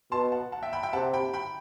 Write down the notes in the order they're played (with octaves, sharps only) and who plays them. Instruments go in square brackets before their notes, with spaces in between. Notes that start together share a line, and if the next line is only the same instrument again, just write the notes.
[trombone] B2 [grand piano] A5 C6
[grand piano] F#5 A5
F#5 A5
E5 G5
G5 B5
E5 G5
[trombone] C3 [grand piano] F#5 A5
[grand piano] G5 B5
G5 B5